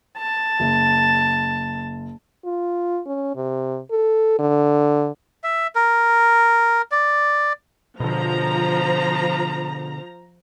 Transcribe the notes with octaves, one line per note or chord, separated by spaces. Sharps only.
A5
F#1
F4
C#4
C3
A4
D3
E5
A#4
D5
B2 D3 F3 A#5